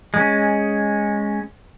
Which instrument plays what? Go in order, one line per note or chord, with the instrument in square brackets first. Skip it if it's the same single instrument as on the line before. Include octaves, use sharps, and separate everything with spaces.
[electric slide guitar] G#3 C#4